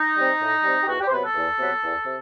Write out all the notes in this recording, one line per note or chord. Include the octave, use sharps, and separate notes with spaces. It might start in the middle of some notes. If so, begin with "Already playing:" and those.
Already playing: D#4
G3 C4
A2
G3 C4
G4
E2 F#4
G4
C5
C3 F#3 B3 B4
A4
E2
C3 F#3 B3
E2
C3